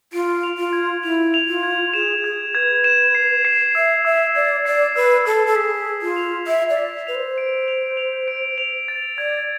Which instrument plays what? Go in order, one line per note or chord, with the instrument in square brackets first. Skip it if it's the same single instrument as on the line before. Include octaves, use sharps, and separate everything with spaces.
[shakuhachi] F4 [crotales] D7
[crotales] F7
[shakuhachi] F4
[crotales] G#6
[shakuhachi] E4 [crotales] F7
[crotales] F7
[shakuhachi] F4
[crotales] G#6
[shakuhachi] G#4 [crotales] E7
[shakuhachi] G#4 [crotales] G#6
[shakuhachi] B4 [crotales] G#6
[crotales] E7
C7
C7
[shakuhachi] E5 [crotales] E6
[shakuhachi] E5 [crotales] E6
[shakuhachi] D5 [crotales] G#6
[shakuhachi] D5 [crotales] C7
[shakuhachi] B4 [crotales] E6
[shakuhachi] A4 [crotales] E6
[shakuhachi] A4
[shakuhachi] G#4 [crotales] B6
[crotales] E6
[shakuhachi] F4
[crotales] F7
[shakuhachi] E5 [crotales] E6
[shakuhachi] D5
[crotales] B6
[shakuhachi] B4 [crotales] F7
[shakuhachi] C5
[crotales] D7
F7
F7
D7
F7
A6
[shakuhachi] D5 [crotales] G#6